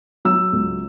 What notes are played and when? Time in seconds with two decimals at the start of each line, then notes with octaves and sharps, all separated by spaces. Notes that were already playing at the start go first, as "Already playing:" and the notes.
0.25 F#3 E6
0.53 C#2